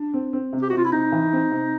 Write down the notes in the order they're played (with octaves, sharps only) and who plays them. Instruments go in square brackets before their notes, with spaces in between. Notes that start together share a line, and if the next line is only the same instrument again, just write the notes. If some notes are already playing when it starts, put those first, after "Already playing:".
Already playing: [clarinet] D4
[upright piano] C4
C4
C3
[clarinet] G4
F#4
[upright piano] C3 [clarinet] F4
[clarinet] E4
[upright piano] C3 [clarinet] D#4
[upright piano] E3
C4
C3